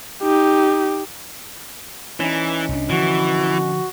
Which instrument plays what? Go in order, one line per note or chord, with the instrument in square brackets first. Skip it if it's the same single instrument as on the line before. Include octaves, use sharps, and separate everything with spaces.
[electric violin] D#4 G4
[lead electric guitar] E3 [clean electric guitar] C#4 D#4
[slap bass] C2 D4
[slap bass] D3 F3 [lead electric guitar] E3 [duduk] F#4